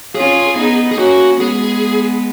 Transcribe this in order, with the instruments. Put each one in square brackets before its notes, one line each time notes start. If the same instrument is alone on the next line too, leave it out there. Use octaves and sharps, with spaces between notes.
[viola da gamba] C#4 F4 [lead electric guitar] G#4
[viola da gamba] B3 D#4
[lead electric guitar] G#4
[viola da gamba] A#3 C#4 [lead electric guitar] F#4
[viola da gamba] G#3 B3 [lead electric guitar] G#4